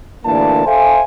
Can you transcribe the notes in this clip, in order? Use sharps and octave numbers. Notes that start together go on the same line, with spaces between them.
D2 A#2 E3 A#3 D4 A5
A4 C5 E5 F5 G#5